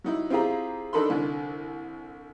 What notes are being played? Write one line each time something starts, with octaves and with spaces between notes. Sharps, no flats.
F#3 D#4 E4
C4 E4 F4 G4 G#4 A#5
D4 D#4 A4 A#4 B5 C6
C2 D3